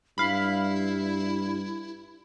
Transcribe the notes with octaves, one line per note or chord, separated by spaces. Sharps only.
G2 E4 F5 B5